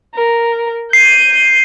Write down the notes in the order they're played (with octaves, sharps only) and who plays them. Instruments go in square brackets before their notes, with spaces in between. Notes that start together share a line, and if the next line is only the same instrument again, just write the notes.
[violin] A#4
[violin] G6 D#7 [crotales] C7